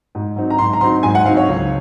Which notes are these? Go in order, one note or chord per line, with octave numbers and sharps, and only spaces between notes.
G#2
F#3 C4 D#4
A#5
G#2 C6
A#5
F#3 C4 D#4 C6
G#2 G#5
F#5
F#3 C4 D#4 F5
C#5
C#2